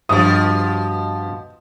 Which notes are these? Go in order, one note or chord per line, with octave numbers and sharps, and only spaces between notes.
G2 B2 F3 C#5 D#6